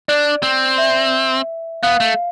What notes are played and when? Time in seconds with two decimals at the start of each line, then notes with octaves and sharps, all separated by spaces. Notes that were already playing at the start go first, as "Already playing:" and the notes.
0.08 D4 D5
0.43 C4
0.78 E5
1.83 B3 F5
2.00 A3